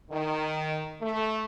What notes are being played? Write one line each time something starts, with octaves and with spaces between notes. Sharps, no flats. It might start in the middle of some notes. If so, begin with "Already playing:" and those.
D#3
A3